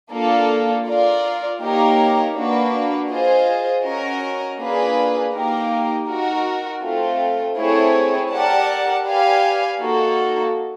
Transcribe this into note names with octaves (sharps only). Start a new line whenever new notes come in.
A#3 D4 F4 A4
F4 A#4 D5
A#3 D#4 G4 A#4 C#5
A#3 D4 F#4 B4
F4 G#4 C5 D#5
C#4 F#4 A#4 D#5
A#3 D4 F4 G#4 B4
A#3 D#4 G4 A#4
D#4 F#4 A#4
A3 C4 F4
A3 C4 E4 G#4 C#5
G4 A#4 D5 F#5 A5
G4 B4 D5 F5 G#5
A#3 D#4 F#4 A4